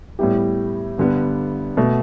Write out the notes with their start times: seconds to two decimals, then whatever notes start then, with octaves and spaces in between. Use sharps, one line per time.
0.19 A2 G3 B3 E4 G4
0.98 G2 D3 G3 B3
1.77 B2 A3